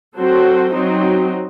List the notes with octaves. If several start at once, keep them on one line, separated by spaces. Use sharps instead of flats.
F#3 C4 F#4 A4 C5
F#3 C4 D#4 F#4